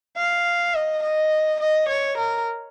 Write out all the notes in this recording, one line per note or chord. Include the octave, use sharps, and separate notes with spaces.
F5
D#5
D#5
D#5
C#5
A#4